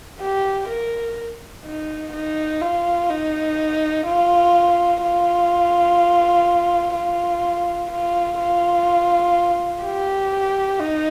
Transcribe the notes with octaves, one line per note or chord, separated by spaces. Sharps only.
G4
A#4
D#4
D#4
F4
D#4
F4
F4
F4
F4
F4
G4
D#4